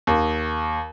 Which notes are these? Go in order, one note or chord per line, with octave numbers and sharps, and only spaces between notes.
D#2